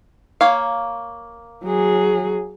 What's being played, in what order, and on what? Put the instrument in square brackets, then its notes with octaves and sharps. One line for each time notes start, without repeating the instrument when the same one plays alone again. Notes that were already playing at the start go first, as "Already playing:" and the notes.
[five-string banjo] A#3 C#5 F5
[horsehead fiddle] F#3 G#4